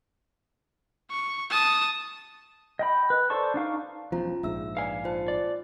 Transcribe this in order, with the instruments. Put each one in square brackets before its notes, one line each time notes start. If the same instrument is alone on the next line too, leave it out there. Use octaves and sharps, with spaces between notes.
[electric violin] C#6
A5 D#6
[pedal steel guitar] D#5 G5 B5
B4
A4 C5 D5 A5 C#6
D4 D#4 F5 C#6
[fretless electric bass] E1 B1 F3 [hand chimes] C#4 F4 A#5
[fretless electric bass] A#1 G#2 [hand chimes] E5 E6
[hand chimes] B4 D5 F6 [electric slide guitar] F5 G#5
[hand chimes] F4 C5 A5
[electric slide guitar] D5